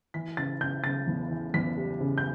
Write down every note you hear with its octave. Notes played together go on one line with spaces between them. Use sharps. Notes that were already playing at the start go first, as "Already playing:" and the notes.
E3 B6
C#3 A6
C#3 G6
C#3 A6
E2
E3
E2 B6
G3
C#3
G6